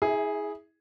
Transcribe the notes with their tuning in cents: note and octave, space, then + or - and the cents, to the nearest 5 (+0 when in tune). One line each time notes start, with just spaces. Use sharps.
E4 -30 G#4 +0 E5 +0